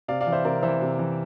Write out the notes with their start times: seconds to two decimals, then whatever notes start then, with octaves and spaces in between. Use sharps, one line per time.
0.08 C3 D5 F5
0.21 D5 F5
0.27 E3
0.32 C5 E5
0.45 C3 A#4 D5
0.63 E3 C5 E5
0.81 C3
0.99 E3